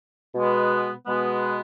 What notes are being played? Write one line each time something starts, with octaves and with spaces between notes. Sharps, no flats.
B2 G#3 B3
B2 G#3 B3